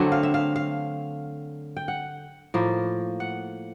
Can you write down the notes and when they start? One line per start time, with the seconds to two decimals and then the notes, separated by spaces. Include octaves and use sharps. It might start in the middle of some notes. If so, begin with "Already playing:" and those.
Already playing: D3 F#3 A3 C4
0.12 F5
0.23 E5
0.34 F5
0.56 F5
1.77 G5
1.88 F#5
2.54 A2 F3 A#3
3.20 F#5